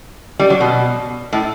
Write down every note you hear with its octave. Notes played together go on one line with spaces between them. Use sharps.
G3
F#3
B2
A2